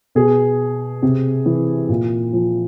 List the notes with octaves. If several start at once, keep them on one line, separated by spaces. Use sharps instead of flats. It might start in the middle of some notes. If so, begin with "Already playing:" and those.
B2 G#4
C3
E3
A#2
F3